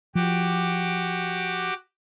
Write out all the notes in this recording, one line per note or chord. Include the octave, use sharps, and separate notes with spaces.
F3 F#4 G4 D6